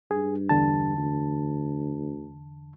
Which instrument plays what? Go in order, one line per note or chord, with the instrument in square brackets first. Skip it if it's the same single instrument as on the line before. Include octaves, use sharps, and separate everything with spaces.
[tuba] G2 [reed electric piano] G#4
[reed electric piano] E2 D3 A5
[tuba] D2